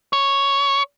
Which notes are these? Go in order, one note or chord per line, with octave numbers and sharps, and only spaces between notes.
C#5